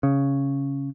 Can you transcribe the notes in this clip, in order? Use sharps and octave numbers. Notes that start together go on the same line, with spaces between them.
C#3